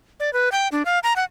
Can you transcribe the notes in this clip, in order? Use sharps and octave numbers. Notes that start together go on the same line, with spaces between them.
D5
B4
G5
D4
F5
A#5
F#5